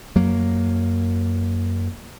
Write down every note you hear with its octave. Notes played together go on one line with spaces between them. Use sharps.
F#2 F#3 A#3